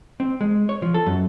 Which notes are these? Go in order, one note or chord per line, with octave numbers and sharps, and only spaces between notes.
C4
G#3
C#5
F3
A4
F#2